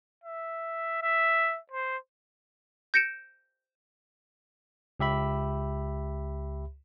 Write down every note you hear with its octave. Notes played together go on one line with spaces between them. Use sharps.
E5
E5
C5
G6 A#6 C#7 D7 E7
C#2 G4 E5 B5